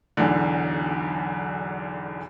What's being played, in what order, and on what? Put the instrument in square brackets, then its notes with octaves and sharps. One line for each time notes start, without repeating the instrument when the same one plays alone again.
[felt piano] B1 E2 D3